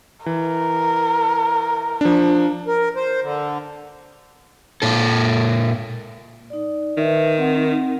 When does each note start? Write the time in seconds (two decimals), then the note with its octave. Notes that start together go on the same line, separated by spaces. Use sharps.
0.26 E3 A#4
2.01 F3 D4
2.67 A#4
2.96 C5
3.23 D3
4.82 A#2 A4
6.50 D#4 D5
6.97 D#3 B4 E5
7.38 C4 D#4 F#5